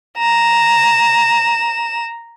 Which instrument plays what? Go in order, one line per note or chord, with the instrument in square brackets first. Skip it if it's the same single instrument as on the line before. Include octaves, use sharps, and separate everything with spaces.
[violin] A#5 E7